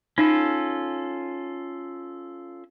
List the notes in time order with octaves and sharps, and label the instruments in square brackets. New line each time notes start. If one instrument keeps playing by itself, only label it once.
[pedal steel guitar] C#4 F4 A4 [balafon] D#4